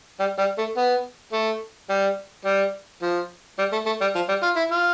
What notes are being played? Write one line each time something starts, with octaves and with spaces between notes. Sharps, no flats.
G3
G3
A3
B3
A3
G3
G3
F3
G3
A3
A3
G3
F3
G3
F4
E4
F4